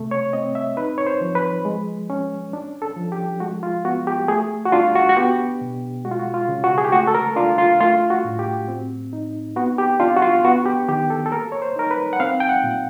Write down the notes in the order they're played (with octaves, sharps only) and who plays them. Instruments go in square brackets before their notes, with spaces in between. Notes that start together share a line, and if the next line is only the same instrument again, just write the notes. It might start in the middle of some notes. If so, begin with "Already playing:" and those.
Already playing: [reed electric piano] C3 A3
C#5
C4 D#5
E5
D#4 B4
C#5
C5
F3
B4
G#3
C#4
D4
A4
F3
G4
G#3 F#4
F4
B3 F#4
G4
A3 G#4
F#4
D4 F4
F#4
F#4
B3 G4
B2
G#3 F#4
F4
F#4
F4
C#3
F#4
G#4
G4
A3 F#4
A4
A#4
D4 F4
F4
A3 F4
F#4
A2
G4
C4
D#4
B3 F#4
G4
D4 F4
F#4
F4
B3 F#4
G4
D#3 G4
A4
A4
A#3 A#4
C#5
C5
D#4 A#4
B4
F#5
C4 F5
G5
F#5
A#2